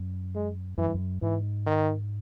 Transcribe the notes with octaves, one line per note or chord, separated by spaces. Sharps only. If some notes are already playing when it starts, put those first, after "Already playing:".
Already playing: F#2
G#3
F#2 E3
G2
F#2
G#2 E3
D#3